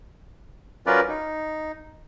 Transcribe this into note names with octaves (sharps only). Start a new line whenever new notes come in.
F#3 C#4 F4 A#4 B4 D5
D#4